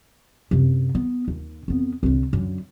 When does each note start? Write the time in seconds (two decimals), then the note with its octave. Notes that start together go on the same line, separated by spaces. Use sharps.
0.51 F#2 C3
0.95 B3
1.28 D#2
1.68 F2 B3
2.03 C2 D3
2.33 F#2 D3